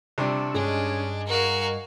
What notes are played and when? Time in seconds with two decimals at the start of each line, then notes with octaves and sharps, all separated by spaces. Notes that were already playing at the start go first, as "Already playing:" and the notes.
0.18 C3 G3 D4 A5 C#6 E6
0.54 G2 G#3 C#4 D4 D#5 G#5
1.28 F#4 A#4 F5